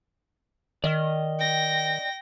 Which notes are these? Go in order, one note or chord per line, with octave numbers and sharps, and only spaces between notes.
D#3 D5 D#5 F6
G5 A#6